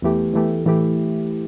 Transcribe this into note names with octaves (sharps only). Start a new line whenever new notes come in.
E2 E3 A3 G4
E2 E3 A3 G4
A2 E3 A3 E4 G4